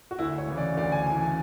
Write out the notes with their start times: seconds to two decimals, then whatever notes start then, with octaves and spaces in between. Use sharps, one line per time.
0.11 F#4
0.19 D2 E4
0.38 C#5
0.48 C#3 E3
0.57 D5
0.77 D2 D5
0.92 G#5
1.07 C#3 E3 G#5
1.21 G#5